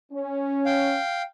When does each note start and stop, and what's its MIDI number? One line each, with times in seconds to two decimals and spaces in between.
0.12 0.98 61
0.66 1.22 77
0.66 1.22 79